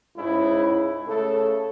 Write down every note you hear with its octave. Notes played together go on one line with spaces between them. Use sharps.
C#2 G#2 C#3 E4
C#3 A3 A4